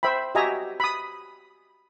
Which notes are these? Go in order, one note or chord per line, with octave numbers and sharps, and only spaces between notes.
C5 E5 G5 B5
F#4 G4 D#5 E5 G#5 A#5
B5 D#6